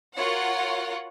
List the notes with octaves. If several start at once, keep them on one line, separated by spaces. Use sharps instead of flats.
F4 F#4 A#4 C#5 F#5